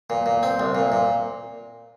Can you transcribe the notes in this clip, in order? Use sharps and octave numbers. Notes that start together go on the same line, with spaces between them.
A#2
A#2
C4
C2
A#2
A#2